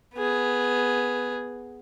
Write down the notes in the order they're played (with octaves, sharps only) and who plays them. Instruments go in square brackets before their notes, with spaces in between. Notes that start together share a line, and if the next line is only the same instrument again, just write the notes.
[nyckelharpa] B3 G#4